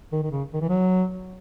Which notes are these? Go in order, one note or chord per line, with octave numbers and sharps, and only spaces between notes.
D#3
D#3
C#3
D#3
E3
F#3